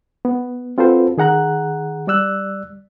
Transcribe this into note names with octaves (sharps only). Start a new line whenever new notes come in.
B3
C4 F4 F#4 A4 B4 C5
D#3 G#4 F#5 A#5 F#6
G3 D5 E6 F#6